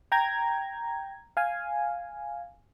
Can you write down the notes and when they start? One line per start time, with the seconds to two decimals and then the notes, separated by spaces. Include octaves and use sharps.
0.12 G5 A#5 G#6
1.37 F5 G#5